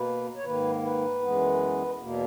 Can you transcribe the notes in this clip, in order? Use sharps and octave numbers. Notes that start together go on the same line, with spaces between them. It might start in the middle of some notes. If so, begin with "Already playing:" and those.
Already playing: B2 A#3 B4
C#5
G#2 D#3 A#3 B4
B4
F#2 E3 G#3 B3
E2 B2 A#3